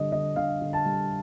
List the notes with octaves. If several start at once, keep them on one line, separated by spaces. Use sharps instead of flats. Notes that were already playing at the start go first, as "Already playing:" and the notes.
Already playing: D3 G3 D#5
D3 D#5
D3 F5
D3
A5
G3